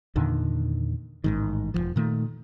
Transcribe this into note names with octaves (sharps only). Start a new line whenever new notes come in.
E2 A#2 D3 D#3
A1 G#2 D#3
E1 C#2 F3
A#2 D#3 A3